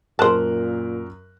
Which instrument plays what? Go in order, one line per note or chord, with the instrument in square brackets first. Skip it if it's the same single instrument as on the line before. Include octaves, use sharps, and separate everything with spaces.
[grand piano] F#2 A#4 F#6 [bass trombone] A#2 [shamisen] C5 A5